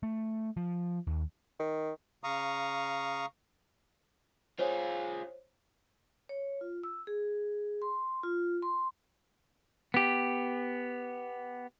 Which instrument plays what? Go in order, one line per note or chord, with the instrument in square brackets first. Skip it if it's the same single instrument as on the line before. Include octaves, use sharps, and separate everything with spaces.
[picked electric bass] A3
F3
D#2
[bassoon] D#3
[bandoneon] C#3 F5 A#5 C#6 D#6
[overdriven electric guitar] F4 G#4 [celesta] C5 C#5
[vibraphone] C#5
F4
E6
G#4
C6
F4
C6
[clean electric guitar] B3 G4